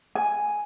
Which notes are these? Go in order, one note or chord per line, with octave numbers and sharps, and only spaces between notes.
G#5